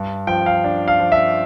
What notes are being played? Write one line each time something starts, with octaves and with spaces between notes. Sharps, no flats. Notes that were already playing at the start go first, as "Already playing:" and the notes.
Already playing: G2
F3 G5
F5
D4
F5
F3
E5